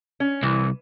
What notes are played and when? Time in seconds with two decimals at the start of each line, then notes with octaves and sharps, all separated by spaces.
0.20 C#4
0.43 C2 E3